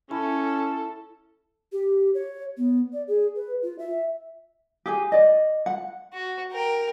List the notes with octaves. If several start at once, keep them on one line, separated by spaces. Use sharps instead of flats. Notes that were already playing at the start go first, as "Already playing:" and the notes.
C#4 E4 A4 A5
G4
C#5
B3
D5
G#4
B4
F4
E5
G4 G#4 G#5
D5 D#5
F#5
F#4
A#4 G5